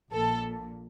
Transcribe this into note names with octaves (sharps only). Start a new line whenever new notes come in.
A#1 A#2 A4